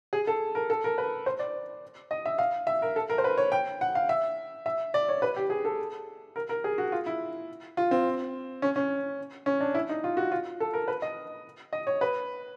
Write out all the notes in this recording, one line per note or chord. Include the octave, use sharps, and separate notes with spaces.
G#4
A4
A#4
A4
A#4
B4
C5
D5
D#5
E5
F5
E5
A#4
A4
A#4
C5
B4
C#5
G5
F#5
F5
E5
E5
D5
C#5
B4
G4
G#4
A4
A#4
A#4
G#4
F#4
F4
E4
F4
C4
C#4
C#4
C#4
D4
E4
D#4
F4
F#4
F4
A4
A#4
B4
D#5
D#5
C#5
B4